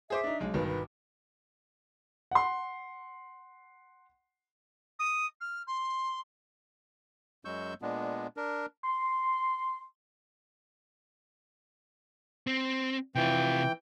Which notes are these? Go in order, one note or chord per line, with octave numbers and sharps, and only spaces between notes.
G#4 C5 E5 D6
D4 D#4
B1 G#3
G1 B2 D#3 B4
B4
F#5 C6
D#6
F6
C6
F#2 F#3 G#3 C#6 E6 G6
A#2 G#3 B3 D4
D4 A#4
C6
C4
C3 E3 F4 G5